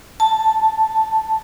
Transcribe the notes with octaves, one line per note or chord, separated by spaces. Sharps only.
A5